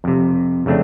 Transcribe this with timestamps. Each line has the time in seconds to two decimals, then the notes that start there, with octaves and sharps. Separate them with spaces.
0.04 F2 C3
0.66 F2 C#3 A3 C4 D4